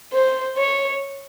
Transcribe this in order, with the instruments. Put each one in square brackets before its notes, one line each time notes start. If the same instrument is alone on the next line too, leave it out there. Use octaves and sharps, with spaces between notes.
[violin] C5
C#5